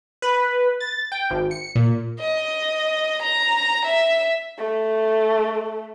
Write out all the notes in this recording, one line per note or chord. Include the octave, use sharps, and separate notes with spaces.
B4
A6
G5
G#1
C#7
A#2
D#5
A#5
E5
A3